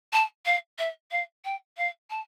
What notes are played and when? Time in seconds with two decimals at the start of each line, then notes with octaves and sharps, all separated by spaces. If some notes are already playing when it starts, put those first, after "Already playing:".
0.13 A5
0.45 F5
0.78 E5
1.11 F5
1.45 G5
1.77 F5
2.10 A5